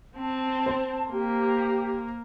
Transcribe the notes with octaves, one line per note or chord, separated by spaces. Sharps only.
C4 A5
C5
A#3 G4